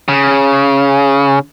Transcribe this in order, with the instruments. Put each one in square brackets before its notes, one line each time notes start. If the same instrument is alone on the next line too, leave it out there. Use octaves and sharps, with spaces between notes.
[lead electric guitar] C#3